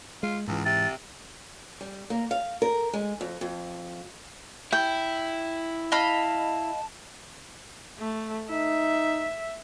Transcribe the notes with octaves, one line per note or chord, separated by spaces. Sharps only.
G#3 F4
C#2 G#2 E3
C3 A6
G3
A#3
F5
A#4
G#3
F2
F2
E4 G5
D#5 F5 A5 B5
A3
D#4 E5